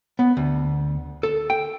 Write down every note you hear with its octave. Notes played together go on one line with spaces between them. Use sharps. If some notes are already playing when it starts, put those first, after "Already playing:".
B3
D2
A4
G5